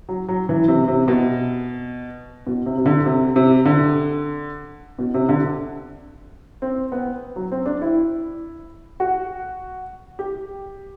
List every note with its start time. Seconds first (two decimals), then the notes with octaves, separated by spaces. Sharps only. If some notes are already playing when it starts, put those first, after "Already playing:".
0.09 F#3
0.29 F#3
0.49 E3
0.68 C3
0.88 C3
1.08 B2
2.47 B2
2.66 C3
2.77 C3
2.86 D3
3.06 C3
3.36 C3
3.65 D3
4.99 B2
5.14 C3
5.29 D3
6.62 C4
6.92 B3
7.36 F#3
7.52 C4
7.66 D4
7.82 E4
9.00 F#4
10.19 G4